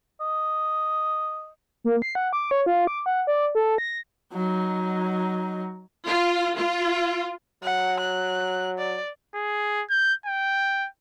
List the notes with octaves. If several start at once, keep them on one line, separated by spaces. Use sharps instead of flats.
D#5
A#3
C7
F#5
D6
C#5
F4
D6
F#5
D5
A4
A#6
F#3 D#4
F4
F4
F#3 F#5
F#6
D5
G#4
G6
G5